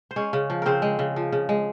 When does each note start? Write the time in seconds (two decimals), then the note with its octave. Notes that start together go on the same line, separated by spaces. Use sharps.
0.11 C5
0.16 G#3 C#4 C#5
0.33 C#3
0.50 F3
0.62 C#3 C4 A#4 C5
0.82 G#3
0.99 C#3
1.16 F3
1.32 C#3
1.49 G#3